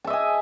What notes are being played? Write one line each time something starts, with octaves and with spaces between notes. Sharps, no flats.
D#5 E5 G#5 A5